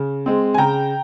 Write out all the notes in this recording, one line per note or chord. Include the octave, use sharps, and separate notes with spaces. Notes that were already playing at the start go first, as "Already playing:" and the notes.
Already playing: C#3
G#3 C4
G#5
C#3 G5 A#5